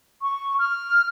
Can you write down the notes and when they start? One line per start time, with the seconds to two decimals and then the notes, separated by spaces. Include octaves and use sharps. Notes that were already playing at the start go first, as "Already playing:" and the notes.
0.22 C#6
0.59 F6